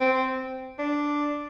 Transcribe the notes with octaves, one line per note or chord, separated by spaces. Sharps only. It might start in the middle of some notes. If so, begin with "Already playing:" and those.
C4
D4